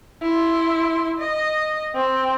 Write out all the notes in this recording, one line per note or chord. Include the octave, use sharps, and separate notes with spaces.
E4 C6
D#5
C4